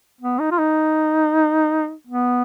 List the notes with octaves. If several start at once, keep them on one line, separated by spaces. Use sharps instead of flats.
B3
D#4
F4
D#4
B3